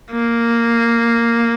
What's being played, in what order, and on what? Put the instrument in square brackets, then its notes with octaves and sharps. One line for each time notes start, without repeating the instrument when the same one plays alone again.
[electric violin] A#3